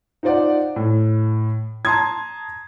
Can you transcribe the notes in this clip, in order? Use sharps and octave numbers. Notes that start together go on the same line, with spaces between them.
D#4 F4 C5 D5 F#5
A2
A5 A#5 C6 D#6 G#6